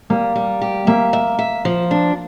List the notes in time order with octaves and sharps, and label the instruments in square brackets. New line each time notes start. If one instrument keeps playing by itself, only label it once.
[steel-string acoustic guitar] G3 [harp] A#3
[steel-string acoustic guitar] G3
G4
[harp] A#3 [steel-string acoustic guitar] E5
[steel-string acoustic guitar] E5
E5
F3
D4